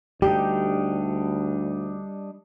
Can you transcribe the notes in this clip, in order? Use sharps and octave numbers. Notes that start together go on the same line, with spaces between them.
D2 G3 D4 D#4 G4